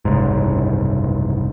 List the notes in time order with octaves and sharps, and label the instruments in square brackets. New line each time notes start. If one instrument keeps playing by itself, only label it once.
[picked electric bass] F#1 C2 G#2